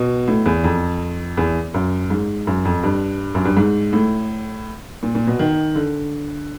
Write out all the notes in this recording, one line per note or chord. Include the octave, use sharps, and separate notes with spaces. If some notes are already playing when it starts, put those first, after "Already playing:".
Already playing: B2
A2
E2
F2
E2
F#2
G#2
F#2
F2
G2
F#2
G2
G#2
A2
A#2
A#2
B2
D#3
D3